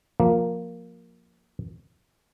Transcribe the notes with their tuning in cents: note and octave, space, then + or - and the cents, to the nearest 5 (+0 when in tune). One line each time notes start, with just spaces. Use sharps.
F3 +20 A#3 +0